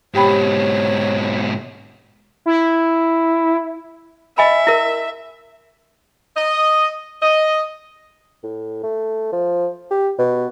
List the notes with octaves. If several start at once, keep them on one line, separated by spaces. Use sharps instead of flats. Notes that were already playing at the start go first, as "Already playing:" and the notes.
G#2 B2 G4 C#5 G5 B5
E4
D#5 E5 G#5 B5
E4 A#4
D#5
D#5
A2
A3
F3
G4
B2